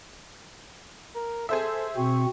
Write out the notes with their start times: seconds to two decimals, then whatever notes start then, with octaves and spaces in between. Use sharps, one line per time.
1.15 A#4
1.49 G#4 A4 C5 E5
1.97 B2 C4 C#6